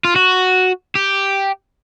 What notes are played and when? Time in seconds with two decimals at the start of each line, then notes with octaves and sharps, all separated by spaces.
0.05 F4
0.16 F#4
0.95 G4